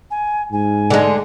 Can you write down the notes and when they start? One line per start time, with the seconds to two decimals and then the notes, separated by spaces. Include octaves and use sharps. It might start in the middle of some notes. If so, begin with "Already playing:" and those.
0.10 G#5
0.52 G#2 G#5
0.90 D3 G#3